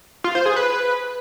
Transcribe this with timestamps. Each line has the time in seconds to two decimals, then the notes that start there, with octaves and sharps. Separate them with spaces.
0.24 F4
0.35 C5
0.46 G#4
0.56 B4